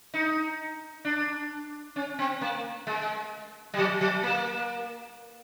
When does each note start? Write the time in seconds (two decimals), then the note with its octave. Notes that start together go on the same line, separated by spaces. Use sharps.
0.14 D#4
1.05 D4
1.96 C#4
2.19 C4
2.41 A#3
2.87 G#3
3.74 G3
3.78 F#3
4.01 F#3
4.23 A#3